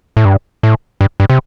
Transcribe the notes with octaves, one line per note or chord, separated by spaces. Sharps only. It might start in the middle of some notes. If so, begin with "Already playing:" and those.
A2
G2
A2
G2
G2
C3